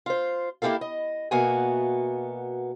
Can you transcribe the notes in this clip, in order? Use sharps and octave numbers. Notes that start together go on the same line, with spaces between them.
F4 C5
A#3 E4 F4 G4 A4 F5
D#5
B2 A#3 B3 F#4 E5 G#5